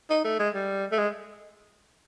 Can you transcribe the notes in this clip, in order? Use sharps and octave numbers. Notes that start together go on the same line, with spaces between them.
D#4
A3
G#3
G3
A3
G#3